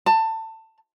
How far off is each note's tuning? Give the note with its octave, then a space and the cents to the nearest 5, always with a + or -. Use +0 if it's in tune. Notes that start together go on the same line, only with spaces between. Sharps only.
A5 +20